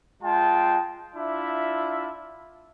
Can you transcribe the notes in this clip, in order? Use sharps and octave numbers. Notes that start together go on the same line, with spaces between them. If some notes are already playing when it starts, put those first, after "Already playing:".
G#3 F4 G5 A5
D4 E4 F4 E5